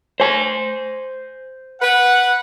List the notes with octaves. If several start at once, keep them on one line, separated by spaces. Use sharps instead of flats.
C5 G#5
B4 F#5